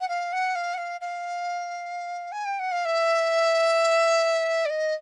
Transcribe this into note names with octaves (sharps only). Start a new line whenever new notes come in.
F#5
F5
F#5
F5
F#5
F5
F5
G#5
G5
F#5
F5
E5
D5
D#5